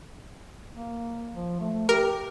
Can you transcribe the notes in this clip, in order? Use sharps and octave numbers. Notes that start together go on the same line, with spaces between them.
A#3
F3
A3
G4 A#4